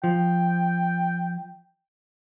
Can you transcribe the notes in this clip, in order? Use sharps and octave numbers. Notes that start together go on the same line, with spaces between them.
F3 G5